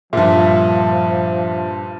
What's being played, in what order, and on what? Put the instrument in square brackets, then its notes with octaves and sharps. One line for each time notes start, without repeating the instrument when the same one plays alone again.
[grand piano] G2 A#2 [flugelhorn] F3 [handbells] F4 E5